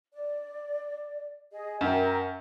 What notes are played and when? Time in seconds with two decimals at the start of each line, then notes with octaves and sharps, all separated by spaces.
0.12 D5
1.52 G#4 D#5
1.81 F#2 A#4 G5